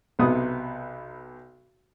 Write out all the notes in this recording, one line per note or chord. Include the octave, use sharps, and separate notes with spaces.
B1 C3 B3 D#6